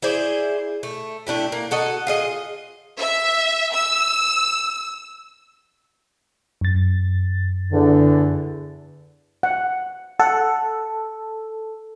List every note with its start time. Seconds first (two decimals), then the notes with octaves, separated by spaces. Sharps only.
0.02 E4 G#4 C5 D5
0.83 A3
1.27 A3 D4 E4 G4
1.52 A#3
1.71 F#4 A4 D#5
2.07 F4 G#4 D#5
2.98 E5
3.74 E6
6.61 F#2 A6
7.73 E2 D3
9.43 F#5
10.19 A4 F#5